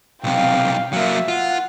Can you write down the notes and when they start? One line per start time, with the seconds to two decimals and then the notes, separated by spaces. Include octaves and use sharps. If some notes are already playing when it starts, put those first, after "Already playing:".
0.24 B1 C3 F5 G5
0.93 F#3 A#3 E5 F5
1.28 F4 F#5